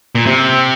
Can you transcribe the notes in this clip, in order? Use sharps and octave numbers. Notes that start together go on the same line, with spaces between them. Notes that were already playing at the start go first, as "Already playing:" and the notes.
A#2
C3